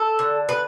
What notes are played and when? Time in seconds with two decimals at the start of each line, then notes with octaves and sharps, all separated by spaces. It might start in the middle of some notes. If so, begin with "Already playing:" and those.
Already playing: A4
0.19 D3
0.49 B4